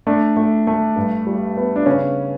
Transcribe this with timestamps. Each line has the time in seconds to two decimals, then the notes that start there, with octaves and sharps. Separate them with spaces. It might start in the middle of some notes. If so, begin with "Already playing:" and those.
0.07 A3 D4
0.37 A3
0.67 A3
0.96 G2
1.27 G3
1.57 B3
1.76 D4
1.86 C#3 C#4